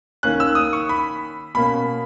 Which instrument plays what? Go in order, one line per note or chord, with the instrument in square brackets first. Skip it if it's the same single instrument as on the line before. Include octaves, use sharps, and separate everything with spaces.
[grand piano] D#3 A#3 C#4 F#6
E6
D#6
C#6
B5
B2 A#3 C#4 B5